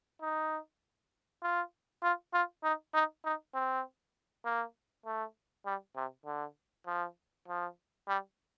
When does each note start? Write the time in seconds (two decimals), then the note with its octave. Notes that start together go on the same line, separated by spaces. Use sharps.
0.22 D#4
1.43 F4
2.03 F4
2.33 F4
2.63 D#4
2.94 D#4
3.24 D#4
3.54 C4
4.45 A#3
5.05 A3
5.66 G3
5.96 C3
6.26 D3
6.86 F3
7.48 F3
8.08 G3